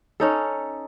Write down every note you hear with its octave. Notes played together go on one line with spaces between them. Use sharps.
C#4 D#4 A4